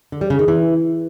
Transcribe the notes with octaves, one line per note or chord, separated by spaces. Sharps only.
D3
G3
C#3
D#3
E3